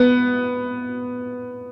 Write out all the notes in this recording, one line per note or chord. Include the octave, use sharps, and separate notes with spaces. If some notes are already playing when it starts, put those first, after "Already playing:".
Already playing: B3